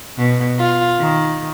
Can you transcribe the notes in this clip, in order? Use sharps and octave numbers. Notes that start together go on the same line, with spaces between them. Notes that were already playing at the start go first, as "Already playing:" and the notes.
B2
F4
D#3